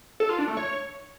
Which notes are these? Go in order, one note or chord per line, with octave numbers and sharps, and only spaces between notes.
A4
F4
D4
A3
C#5